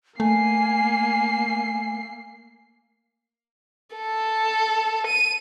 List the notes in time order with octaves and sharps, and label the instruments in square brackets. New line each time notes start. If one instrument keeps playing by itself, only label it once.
[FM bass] A3 [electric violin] A#3 C7 [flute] G#5
[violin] A4
D#7